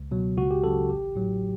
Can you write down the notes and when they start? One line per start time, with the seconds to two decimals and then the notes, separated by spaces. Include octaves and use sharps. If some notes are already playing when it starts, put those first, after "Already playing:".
Already playing: C#2
0.11 B2 F#3
0.37 C#2 F#4
0.51 G4
0.63 C#3 F#3 A4
0.90 A1 G4
1.15 A2 F#3